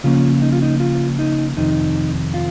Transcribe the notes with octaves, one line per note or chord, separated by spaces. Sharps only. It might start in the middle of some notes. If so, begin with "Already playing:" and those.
C#3 F3 A#3 C#4 F4
D#4
F4
D#4
F4
D#4
F2 C3 D#3 D#4
F4